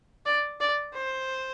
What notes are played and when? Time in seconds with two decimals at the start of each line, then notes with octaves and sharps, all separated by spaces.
0.26 D5
0.60 D5
0.93 C5